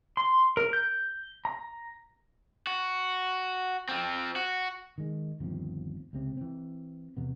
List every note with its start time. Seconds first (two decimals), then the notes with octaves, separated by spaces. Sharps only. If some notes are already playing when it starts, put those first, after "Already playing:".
0.17 C6
0.57 A#4
0.73 G6
1.45 A#5
2.67 F#4
3.89 F3 C4
4.36 F#4
4.98 D#3 G#3
5.40 G1 D#2 F3 C4
6.13 C#2 C3 C4
6.37 E3 C4
7.17 E2 C3 B3